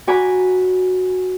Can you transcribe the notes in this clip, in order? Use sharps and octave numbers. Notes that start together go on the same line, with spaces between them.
F#4 D5 G#5 A#5 B5 D6